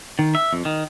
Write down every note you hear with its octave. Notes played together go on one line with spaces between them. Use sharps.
D#3
E5
F2
D#3